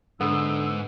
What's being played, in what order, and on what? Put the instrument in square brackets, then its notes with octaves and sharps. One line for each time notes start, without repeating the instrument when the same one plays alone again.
[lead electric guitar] G#2 [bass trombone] D3 [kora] B3 [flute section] E6